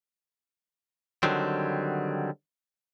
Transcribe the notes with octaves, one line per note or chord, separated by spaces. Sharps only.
D3 D#3 F#3 G3 C4